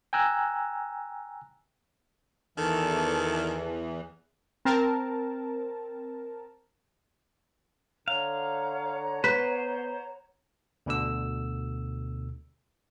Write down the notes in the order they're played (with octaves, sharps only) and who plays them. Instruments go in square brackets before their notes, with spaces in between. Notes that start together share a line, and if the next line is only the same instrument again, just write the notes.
[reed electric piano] G5 G#5 A#5 E6 F#6
[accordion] E2 E3 [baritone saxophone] D#3 [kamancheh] A4
[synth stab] C4 A#4 A5
[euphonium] D3 [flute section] C#5 F#5 A#5 [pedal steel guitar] F5
[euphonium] B3 [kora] B4 [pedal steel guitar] C5
[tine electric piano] D2 B2 D3 E6